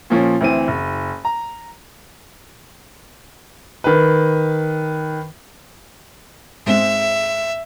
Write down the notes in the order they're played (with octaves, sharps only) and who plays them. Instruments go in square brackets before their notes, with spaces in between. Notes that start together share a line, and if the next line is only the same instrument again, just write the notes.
[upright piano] A#2 F3 C#4
D2 E3 C4 D#7
F#1
A#5
[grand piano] D#3 B4
[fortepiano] G#2 G#3 C4 [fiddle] E5